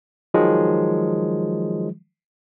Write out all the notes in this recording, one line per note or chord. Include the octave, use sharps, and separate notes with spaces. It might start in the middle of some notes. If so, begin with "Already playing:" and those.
D#3 F3 F#3 G#3